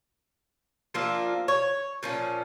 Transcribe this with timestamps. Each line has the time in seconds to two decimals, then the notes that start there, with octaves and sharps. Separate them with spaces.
0.94 F3 A#3 D4 F4 E5
1.48 C#5
2.03 A#2 F3 C#4